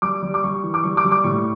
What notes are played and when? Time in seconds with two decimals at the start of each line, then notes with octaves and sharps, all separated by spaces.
0.02 G3 D6
0.23 G3
0.34 D6
0.44 G3 C#6
0.63 E3
0.74 D6
0.84 G3 C#6
0.97 D6
1.05 G3
1.12 D6
1.24 A2 C#6